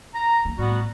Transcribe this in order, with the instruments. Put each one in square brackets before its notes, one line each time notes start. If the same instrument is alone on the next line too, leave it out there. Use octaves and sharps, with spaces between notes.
[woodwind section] A#5
[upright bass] A#3 C4
[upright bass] A2 A3 [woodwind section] G3 B3 F#4